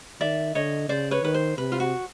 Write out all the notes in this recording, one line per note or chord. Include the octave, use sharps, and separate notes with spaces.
D#3 D5 E5
D3 C#5 D#5
C#3 C5 D5
B4 C#5
D#3 B4
C5
C3 B4
F4
F#4